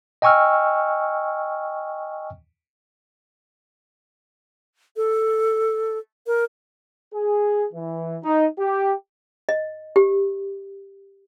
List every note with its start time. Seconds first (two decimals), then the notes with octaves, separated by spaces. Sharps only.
0.22 D#5 G5 G#5 C#6 E6 F6
4.96 A4
6.27 A#4
7.14 G#4
7.73 E3
8.24 D#4
8.59 G4
9.49 D#5
9.96 G4